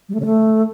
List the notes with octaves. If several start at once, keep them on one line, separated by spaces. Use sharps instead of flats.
G3
A3
C#3
A3